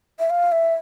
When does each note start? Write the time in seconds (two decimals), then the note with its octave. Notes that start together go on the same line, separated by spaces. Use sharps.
0.19 E5
0.30 F5
0.52 E5